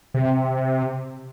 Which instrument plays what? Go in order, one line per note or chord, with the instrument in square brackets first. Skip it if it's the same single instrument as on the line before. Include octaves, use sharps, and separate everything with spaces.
[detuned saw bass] C3